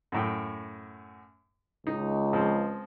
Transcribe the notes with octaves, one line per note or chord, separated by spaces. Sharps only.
F#2 A2 G5
C#2 D#4
F3 G#3 C4